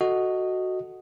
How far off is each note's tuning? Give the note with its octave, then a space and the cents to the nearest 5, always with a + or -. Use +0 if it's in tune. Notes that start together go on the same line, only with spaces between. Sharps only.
F#4 +0 A4 +0 D#5 +0